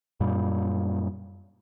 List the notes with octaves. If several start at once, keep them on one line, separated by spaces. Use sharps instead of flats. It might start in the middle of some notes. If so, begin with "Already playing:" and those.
F#2 A#2 G3